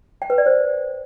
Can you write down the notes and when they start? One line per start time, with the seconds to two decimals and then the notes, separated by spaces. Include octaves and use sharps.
0.22 G5
0.30 B4
0.38 D5
0.46 C5